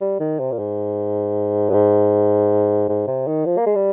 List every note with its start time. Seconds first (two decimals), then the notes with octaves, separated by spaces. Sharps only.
0.01 G3
0.20 D#3
0.40 C3
0.52 A#2
0.59 G#2
1.69 G2
1.74 G#2
2.89 G#2
3.07 C3
3.27 D#3
3.46 F3
3.57 A#3
3.66 G#3
3.75 G3